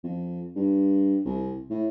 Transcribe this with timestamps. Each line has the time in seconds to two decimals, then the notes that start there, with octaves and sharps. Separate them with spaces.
0.04 F2
0.56 G2
1.25 C2
1.70 A2